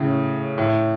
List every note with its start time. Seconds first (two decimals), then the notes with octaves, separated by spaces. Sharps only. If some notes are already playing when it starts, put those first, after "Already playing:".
Already playing: A2 C#3
0.58 A2